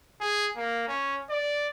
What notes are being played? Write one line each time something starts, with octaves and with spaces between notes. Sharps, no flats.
G#4
A#3
C#4
D5